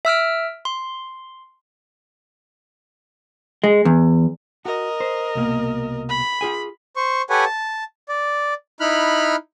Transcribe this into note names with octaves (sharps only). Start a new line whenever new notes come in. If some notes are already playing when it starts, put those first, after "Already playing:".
E5 E6 F6 D7
C6
G#3
E2
F#4 A#4 D#5
C5
C2 B2 A#3
B5
F4 G#4 G#5
C5 C#6
G4 A4 B4 C#5 F#5 G#5
A5
D5
D#4 E4 B5 F6 F#6